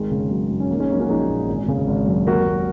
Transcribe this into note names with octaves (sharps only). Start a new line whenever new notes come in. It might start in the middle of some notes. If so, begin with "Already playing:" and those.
Already playing: G#1 D#3 G#3
C#3
F#3
F#2
C#4
A#1 A#3 D#4
G#3 C#4
F#3 A#3 D#4
C#4 F#4
A#1 D#4 G#4
A#2
G#1
C#3
G#1
F#2
D#2 F#4 A#4
F#3